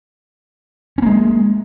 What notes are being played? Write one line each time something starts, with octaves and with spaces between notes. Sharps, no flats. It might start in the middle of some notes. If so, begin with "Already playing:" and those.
G#3 A#3 C#4